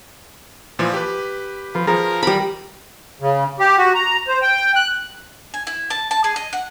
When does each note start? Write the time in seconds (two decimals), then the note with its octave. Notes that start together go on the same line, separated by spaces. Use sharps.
0.79 A#2 E3 F3
0.94 G4 B4
1.75 F3 B4
1.87 F3 G#4 A#4 A#5
2.23 G3 A#4 B5
3.21 C#3
3.60 G4
3.78 F#4
3.94 A#5
4.28 C5
4.42 G5
4.76 F#6
5.54 G#5
5.67 E4
5.90 A5
6.11 A5
6.24 G#4
6.36 D#5
6.53 F#5